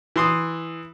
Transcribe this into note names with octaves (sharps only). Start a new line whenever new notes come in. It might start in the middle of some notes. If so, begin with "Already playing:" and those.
E3 C6 D#6